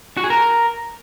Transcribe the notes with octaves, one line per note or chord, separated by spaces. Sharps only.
F#4
G#4
A#4